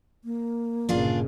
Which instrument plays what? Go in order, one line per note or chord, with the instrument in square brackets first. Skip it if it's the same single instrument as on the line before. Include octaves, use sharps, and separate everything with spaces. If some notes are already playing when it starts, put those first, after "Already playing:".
[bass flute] A#3
[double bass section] G1 A#2 C#3 [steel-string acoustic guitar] D4 F4 G#4